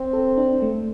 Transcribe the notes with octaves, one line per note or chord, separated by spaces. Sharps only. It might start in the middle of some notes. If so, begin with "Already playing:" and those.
Already playing: C4
A4
D4
A3